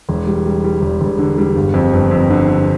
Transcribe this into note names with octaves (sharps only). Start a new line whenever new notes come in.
E1
G3
G3
G3
E1
E1
D3
G3
G1
F2
G1
F2
D3
D3